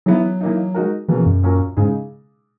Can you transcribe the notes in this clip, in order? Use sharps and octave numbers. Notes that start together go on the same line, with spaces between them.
E3 F#3 B3 E4
E3 A#3 D#4
G#3 D#4 F#4 A#4
B2 E3 F#3 A#3 C#4 G#4
F#2
A#2 F#3 C#4 F#4 A#4
G#2 C#3 G#3 D#4 G#4